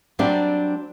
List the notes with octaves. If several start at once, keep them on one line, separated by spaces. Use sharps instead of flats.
F#3 G3 C4 D4 D5